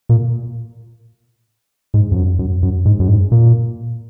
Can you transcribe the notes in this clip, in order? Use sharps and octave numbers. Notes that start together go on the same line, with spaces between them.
A#2
G#2
F2
F#2
F#2
F#2
G#2
F#2
G#2
A#2